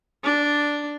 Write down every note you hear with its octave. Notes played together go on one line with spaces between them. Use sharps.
D4